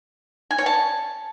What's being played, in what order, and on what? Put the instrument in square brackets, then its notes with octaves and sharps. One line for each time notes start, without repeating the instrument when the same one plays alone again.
[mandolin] G#5
C#5
A5